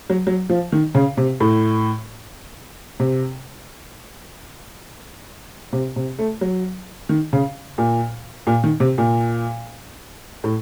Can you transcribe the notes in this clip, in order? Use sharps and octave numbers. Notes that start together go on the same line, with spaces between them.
F#3
F#3
F3
D#3
C#3
C3
A2
C3
C3
C3
A3
F#3
D#3
C#3
A#2
A#2
D#3
C3
A#2
A2